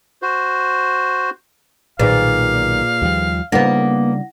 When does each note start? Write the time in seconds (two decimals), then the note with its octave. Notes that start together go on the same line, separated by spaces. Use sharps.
0.22 F#4 C5
1.99 B1 A#2 D#3 F4 G#4 B4 F5
3.02 D#2 F3 G3
3.52 C#3 G3 A#3 B3 D4 E4 F#5 A#6